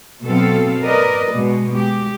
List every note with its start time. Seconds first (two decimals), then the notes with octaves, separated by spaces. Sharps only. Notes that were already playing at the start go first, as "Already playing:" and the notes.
0.24 B2 F#3 C4 A4 F5
0.83 A#4 B4 D5 D#5
1.34 B2 G#3
1.75 G#3 G4